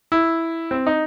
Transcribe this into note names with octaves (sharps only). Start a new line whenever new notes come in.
E4
C4
D#4